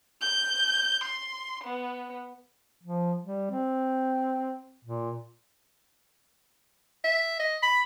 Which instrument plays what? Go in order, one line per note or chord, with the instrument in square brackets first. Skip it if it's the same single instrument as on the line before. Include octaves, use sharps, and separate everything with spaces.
[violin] G6
C6
B3
[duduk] F3
G3
C4
A#2
[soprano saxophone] E5
D#5
B5